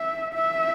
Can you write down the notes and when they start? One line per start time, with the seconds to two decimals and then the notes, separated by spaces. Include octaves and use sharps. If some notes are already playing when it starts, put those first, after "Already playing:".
Already playing: E5
0.34 E5